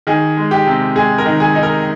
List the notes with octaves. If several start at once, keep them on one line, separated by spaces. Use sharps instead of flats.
D#3 G#4
G#3
G4
C3
G#3 G#4
A#4
D#3
G#4
D#4
A#4